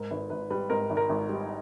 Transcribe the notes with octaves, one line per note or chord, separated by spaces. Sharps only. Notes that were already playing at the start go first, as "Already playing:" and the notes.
Already playing: G#2 A#4
G#1 B4
G#1 B4
G3 B4
G#2 A#4
G#1
A#4
G#1
G3